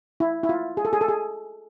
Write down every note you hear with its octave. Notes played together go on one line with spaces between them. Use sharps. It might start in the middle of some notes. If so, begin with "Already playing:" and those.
E4
E4
F4
G#4
A4
G#4
A4
G#4